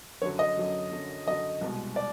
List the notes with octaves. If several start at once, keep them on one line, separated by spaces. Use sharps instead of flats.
F#2 D3 F#3 C#5
D#5
F#2 D3 F#3
F#2 D3 F#3
F#2 D3 F#3 D#5
C2 B2 G#3
D5